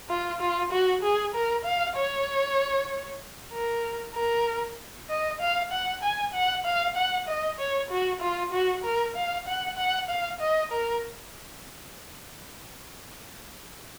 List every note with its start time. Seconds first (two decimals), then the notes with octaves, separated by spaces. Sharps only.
0.09 F4
0.40 F4
0.72 F#4
1.03 G#4
1.34 A#4
1.65 F5
1.96 C#5
3.52 A#4
4.15 A#4
5.10 D#5
5.40 F5
5.72 F#5
6.03 G#5
6.33 F#5
6.65 F5
6.96 F#5
7.28 D#5
7.59 C#5
7.91 F#4
8.21 F4
8.52 F#4
8.84 A#4
9.16 F5
9.47 F#5
9.77 F#5
10.09 F5
10.41 D#5
10.72 A#4